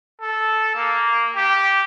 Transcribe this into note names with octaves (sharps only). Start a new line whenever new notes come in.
A4
A#3
G4